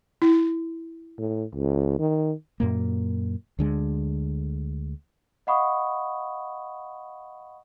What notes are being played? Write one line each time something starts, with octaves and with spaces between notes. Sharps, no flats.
E4
A2
C#2
D#3
F#2 A#2 A#3
D2 D3 G#3
D#5 F5 F#5 B5 C#6 D#6